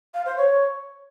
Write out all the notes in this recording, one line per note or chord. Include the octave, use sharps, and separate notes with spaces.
F5
C5
C#5